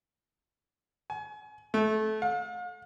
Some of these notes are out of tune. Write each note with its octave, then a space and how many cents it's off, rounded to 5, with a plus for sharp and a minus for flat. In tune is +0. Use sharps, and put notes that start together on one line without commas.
G#5 +30
A3 -20
F5 +45